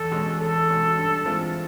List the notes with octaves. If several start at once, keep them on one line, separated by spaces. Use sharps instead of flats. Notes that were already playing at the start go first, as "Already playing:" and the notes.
Already playing: E2 A4
B2 G#3 C#4
E2 A4
B2 G#3 C#4
G2
E3 G#3 C4 F4